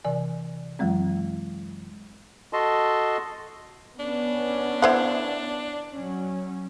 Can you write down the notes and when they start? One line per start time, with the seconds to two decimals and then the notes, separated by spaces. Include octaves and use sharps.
0.05 C3 E3 D5 G#5
0.79 F#2 E3 F#3 G#3 C4
2.53 F#4 A4 D#5 A5 C6
3.99 B3 C#4 D4
4.82 E4 C5 F#5
5.93 F#3 C#4